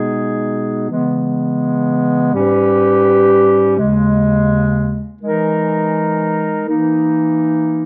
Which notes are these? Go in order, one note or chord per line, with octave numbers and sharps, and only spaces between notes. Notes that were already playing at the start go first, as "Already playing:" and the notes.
Already playing: B2 G#3 B3 D#4 G#4
C#3 E3 G#3 B3
G#2 G3 C#4 G4 B4
D#2 C#3 G#3
E3 G#3 D#4 A#4
E3 A#3 D#4